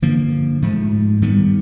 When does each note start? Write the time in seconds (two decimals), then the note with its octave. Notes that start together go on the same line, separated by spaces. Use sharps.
0.02 G2 D3 F3 A#3
0.62 G#2 F3 A3
1.22 G2 D#3 G3 B3